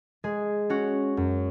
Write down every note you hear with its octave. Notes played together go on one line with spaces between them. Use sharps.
G#3 G#4
C#4 F#4
F#2